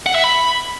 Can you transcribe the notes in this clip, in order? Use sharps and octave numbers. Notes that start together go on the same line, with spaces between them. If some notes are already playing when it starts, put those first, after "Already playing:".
F#5
E5
B5